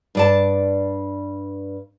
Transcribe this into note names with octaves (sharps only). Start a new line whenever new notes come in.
G2 D5 A5